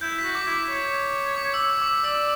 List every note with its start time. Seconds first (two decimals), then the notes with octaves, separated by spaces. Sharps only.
0.01 E4 G6
0.18 B6
0.24 F#4
0.35 D6
0.46 E4
0.52 D6
0.69 C#5
1.36 D6
1.54 E6
1.59 D6
1.82 D6
2.04 D5 E6